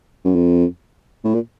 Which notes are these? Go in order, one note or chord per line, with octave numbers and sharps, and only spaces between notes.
F#2
F2
A2
A#2